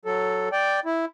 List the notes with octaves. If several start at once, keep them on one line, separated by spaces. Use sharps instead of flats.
F#3 A4
D5 G5
E4